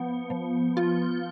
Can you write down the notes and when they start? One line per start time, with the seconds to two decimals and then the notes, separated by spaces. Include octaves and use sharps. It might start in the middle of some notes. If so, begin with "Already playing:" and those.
Already playing: F3 B3
0.30 F3
0.77 F4